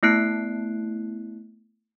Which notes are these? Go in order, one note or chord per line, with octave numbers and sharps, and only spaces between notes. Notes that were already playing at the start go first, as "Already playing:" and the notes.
A3 B3 E4 F#6 C7 D7